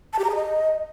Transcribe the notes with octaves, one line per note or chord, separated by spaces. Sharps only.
A5
G4
A#5
G#4
D#5